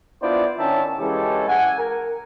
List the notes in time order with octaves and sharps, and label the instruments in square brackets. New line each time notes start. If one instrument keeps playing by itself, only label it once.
[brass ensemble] B3 D4 E4 F4 C5 D5
D#3 C#4 D4 E4 E5 A5
C#3 E3 G#3 C#4 G4 A4
F#5 G#5
A#4